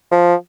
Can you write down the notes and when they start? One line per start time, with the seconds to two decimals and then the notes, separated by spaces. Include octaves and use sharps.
0.11 F3